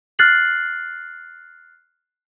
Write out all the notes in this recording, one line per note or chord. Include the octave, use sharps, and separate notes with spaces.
F6 F#6 A6 C7 F#7